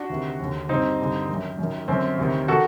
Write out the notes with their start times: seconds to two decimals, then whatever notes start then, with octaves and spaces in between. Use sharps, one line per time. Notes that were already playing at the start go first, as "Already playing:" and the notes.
Already playing: D4 F#4
0.10 D2 C3 D#3
0.39 D#2 D3
0.69 G2 D3 C4 D#4
0.99 G2 D3
1.29 F#2 D#3
1.59 F#2 D#3
1.88 F#2 D3 C4
2.18 D2 C3 D#3
2.48 D#3 F#4 A4